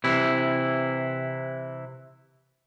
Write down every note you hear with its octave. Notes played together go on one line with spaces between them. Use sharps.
C3 E3 E4